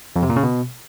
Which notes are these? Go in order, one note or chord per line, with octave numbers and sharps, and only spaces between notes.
F2
C3
A#2
C#3
B2